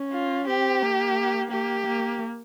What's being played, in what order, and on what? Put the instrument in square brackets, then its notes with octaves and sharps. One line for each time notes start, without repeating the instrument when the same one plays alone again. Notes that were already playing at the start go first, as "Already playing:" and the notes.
Already playing: [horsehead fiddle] C#4
[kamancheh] F4
[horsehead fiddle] C4 [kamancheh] G4
[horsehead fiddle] A#3
[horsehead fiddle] A#3 [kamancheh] G4
[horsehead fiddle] A#3